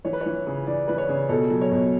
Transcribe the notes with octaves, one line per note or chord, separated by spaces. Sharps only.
E3 C#5
B4
C#5
E3
C#3
E3 D5
E3 B4
C#5
C#3
B2 A4
F#3
C#5
B2